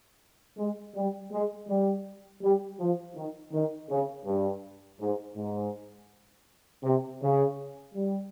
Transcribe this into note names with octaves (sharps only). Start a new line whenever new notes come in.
G#3
G3
G#3
G3
G3
F3
D#3
D#3
C#3
G2
G#2
G#2
C3
C#3
G3